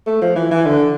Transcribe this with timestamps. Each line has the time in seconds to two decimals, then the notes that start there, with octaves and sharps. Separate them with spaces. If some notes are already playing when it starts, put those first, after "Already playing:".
0.07 A3
0.21 F3
0.36 E3
0.51 E3
0.66 D3